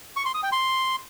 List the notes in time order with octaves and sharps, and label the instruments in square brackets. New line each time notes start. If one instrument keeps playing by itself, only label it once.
[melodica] C#6
C6
D#6
G5
C6